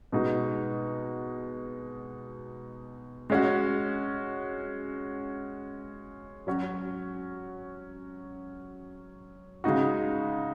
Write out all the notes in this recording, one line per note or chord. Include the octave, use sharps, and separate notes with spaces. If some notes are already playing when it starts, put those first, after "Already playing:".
B2 G#3 D#4 F#4
G#3 C#4 F#4
F#3 C#4 F#4
C#3 G#3 D#4 F#4